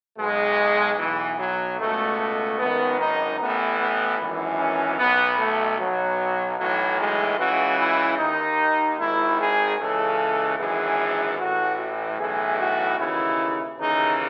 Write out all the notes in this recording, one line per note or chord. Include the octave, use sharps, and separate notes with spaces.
B1 B2 G#3
B1 B2 E3
F#3
C#2 B2 A3
A3
G#1 F#2 D#3 B3
D#4
A1 A2 E3 B3
B3
G#1 F#2 E3
C#4
B1 B2 B3
A3
B1 B2 F#3
B1 A2 E3 F#3
G#3
C#2 C#3 E3 F#4
E4
D#2 D#3 D#4
G#1 G#2 D#3 E4
G#4
C#2 C#3 E3 A4
G#1 F#2 E3 G#4
A1 A2 E3 F#4
B1 A2 E3 G#4
F#4
D#2 C#3 E3 E4
D#2 C#3 E3 D#4